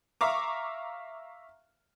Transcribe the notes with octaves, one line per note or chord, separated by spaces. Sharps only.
E5 F5 A#5 C#6 D6